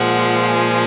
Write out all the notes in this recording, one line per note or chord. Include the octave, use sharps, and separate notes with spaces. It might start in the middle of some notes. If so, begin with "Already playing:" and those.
Already playing: A#2 F3 G#3 F#5
G#5